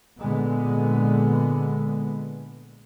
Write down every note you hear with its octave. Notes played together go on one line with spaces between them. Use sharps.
A#2 D3 G#3 B3